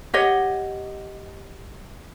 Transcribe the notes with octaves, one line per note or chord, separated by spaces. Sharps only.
G4 C#5 D#5 F#5